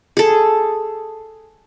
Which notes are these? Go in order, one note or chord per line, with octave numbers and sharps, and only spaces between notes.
G#4 A4